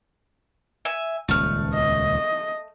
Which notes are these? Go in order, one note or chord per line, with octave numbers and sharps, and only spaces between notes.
E5 G#5
D#1 C#2 A3 F6
D#5